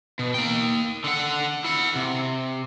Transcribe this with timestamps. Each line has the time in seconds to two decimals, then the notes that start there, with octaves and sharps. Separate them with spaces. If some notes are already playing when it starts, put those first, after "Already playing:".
0.19 B2
0.34 A#3 G5
1.04 D3 F#5
1.65 E4 F#5
1.95 C3